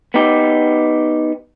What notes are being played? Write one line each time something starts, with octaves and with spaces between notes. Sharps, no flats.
B3 D#4 G4